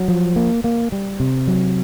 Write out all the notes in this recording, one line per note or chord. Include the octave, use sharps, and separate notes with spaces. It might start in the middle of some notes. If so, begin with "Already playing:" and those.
Already playing: F#3
F3
A#3
A#3
G3
C3
F#3